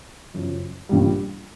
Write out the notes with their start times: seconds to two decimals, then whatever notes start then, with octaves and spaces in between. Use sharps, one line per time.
0.34 F#2 C#3 F3
0.89 A#1 A#2 G3